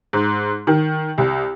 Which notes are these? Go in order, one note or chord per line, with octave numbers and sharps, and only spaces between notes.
G#2
D#3
C2